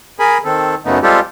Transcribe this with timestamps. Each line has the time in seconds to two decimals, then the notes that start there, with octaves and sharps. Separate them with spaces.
0.19 G#4 A#4 G#5 B5
0.44 D#3 C4 A4
0.85 F#2 C#3 A3 B3 D#4
1.03 G3 G#3 C4 F4 G4 A4